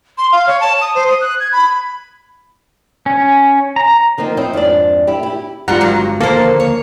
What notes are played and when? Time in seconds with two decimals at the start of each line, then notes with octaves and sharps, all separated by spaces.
0.18 C6
0.32 F5
0.47 C#5
0.60 A5
0.81 D#6
0.95 C5
1.08 D#6
1.21 F#6
1.40 G#6
1.52 B5
3.06 C#4
3.76 A#5
4.18 D3 F3 A#3 C4 D#4
4.37 F2 C4 D#4 E4 C#5
4.53 F2 G#2 D4 D5
5.07 E4 G4
5.23 E4 G4
5.68 G1 G3 G#3 D4 F4 F#5 A#5
5.81 G2 F#3
6.20 D#2 D3 F3 A#3 A4 C5
6.60 C#5